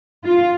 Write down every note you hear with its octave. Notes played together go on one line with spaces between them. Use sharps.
F4